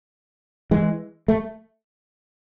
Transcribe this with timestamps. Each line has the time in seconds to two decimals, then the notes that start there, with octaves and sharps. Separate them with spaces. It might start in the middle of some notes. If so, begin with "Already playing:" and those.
0.71 E3 G#3
1.28 A3